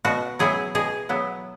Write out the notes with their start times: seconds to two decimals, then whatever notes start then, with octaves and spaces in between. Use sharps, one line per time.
0.05 B2 F#4
0.39 F#3 B3 E4 G#4
0.75 B2 G#4
1.09 F#3 B3 E4